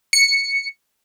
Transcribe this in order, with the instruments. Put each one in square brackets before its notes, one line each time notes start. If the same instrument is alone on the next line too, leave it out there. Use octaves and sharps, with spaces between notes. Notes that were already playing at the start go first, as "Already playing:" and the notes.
[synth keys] C#7